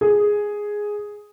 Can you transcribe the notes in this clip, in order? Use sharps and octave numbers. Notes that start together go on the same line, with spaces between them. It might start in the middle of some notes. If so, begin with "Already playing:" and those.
G#4